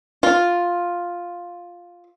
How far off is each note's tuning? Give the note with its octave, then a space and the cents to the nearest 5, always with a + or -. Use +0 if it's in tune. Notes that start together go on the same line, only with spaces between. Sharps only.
F4 +5